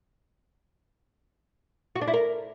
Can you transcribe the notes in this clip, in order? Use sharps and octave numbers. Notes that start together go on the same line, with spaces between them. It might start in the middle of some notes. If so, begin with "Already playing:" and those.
F#4
D4
E4
A#4